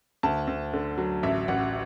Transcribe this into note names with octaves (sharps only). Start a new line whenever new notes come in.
D2 A5
D2
D3
F#3
A1 E5
A1 F#5